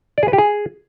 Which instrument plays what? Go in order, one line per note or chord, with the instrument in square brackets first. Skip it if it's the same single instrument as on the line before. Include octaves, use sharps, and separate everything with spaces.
[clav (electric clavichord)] D5
G#4
B4
G4
G#4